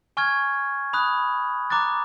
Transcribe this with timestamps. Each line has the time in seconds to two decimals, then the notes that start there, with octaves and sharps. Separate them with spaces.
0.17 G#5 C#6 F6 G#6
0.93 B5 D#6 F#6
1.70 A#5 D6 F#6 A6